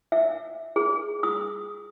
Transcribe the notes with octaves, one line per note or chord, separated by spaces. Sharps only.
E5
G#4
D#6